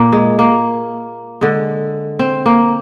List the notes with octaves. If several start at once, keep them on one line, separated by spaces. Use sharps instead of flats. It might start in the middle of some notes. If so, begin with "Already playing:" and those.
Already playing: A#2 A#3
G#3
A#3
D3 G#3
C4
A#3